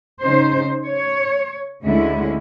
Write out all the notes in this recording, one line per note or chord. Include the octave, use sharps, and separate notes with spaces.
C#3 D#4 C5
C#5
D2 D3 G#3 C#4 E4